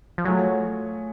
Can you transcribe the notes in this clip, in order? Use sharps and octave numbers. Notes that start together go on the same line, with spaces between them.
F3
F#3 A3 F4 G#4 C#5